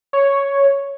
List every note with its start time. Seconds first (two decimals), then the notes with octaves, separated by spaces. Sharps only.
0.13 C#5